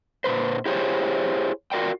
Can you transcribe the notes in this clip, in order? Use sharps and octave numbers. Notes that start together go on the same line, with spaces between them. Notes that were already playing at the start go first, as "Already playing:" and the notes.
A#2 F3 B4 C5
E4 G4 G#4 A#4 C5 C#5
F4 F#4 A#4 D5 G5